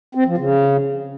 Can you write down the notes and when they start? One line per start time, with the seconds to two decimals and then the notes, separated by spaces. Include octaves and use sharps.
0.15 C4
0.26 F3
0.38 C#3